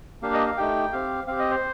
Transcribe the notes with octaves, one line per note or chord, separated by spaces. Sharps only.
A#3 D4 G4 F5
D#5
F5
A3 D#4 G4 G5
C4 G4 F5
C4 G4 F5
D#5
C5